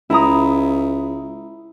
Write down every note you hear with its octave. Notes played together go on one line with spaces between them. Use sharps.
C#2 E4 A#5 D#6